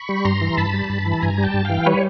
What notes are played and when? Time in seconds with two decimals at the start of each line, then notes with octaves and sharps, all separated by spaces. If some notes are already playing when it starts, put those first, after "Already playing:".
Already playing: B5 C#6
0.09 G3
0.25 G2 A#5 C6
0.41 E3
0.57 G2 A5 B5
0.74 G3
0.89 G2
1.05 E3
1.12 A5
1.22 G2 G#5 A#5
1.38 G3
1.43 G5 A5
1.54 G2
1.65 E3 F5 G5
1.86 G3 B4 C#5